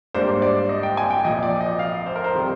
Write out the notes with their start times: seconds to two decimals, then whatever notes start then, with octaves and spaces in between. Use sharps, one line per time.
0.14 G#2 G3 A#3 D4 C5
0.42 D5
0.69 D#5
0.83 G5
0.97 G#5
1.10 G5
1.24 A#1 A#2 F3 D#5
1.43 D5
1.61 D#5
1.79 F5
2.06 C5
2.16 A#4
2.24 C5
2.35 D#3 G3 C4